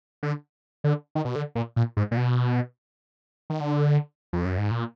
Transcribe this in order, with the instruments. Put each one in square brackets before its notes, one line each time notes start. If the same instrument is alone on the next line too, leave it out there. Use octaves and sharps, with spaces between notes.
[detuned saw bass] D3
D3
D#3
B2
D3
A#2
A#2
G#2
A#2
B2
D#3
D3
F2
F#2
G#2
A#2